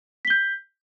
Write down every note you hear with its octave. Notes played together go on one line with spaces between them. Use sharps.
G6 B6 G7